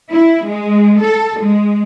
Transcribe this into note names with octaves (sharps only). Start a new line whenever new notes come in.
E4
G#3
A4
G#3